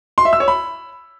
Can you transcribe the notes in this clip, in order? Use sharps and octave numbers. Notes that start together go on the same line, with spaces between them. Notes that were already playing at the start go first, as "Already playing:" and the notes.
C6
E5
E6
C#5
B5